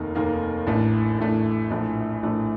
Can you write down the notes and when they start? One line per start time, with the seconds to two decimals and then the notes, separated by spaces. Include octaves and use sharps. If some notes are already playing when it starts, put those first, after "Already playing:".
Already playing: F1 D#2 D#3 A#3 D#4
0.15 F1 D#2 D#3 A#3 D#4
0.67 A1 A2 A3 D4
1.18 A1 A2 A3 D4
1.70 A#1 A2 F3 A3 D4
2.23 A#1 A2 F3 A3 D4